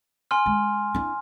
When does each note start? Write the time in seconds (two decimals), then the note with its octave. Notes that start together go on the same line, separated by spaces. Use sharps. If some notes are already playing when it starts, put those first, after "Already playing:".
0.31 G#5 C6 F6
0.46 G#3
0.94 D4 E4